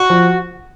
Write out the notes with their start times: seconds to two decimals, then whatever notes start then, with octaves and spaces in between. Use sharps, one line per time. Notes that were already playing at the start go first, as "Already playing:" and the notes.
Already playing: F#4
0.10 F3